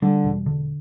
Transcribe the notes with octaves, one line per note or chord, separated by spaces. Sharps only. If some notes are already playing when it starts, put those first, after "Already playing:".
D3 G3
E1
D3